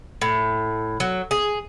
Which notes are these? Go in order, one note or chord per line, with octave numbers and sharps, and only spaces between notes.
A2
F#3
G#4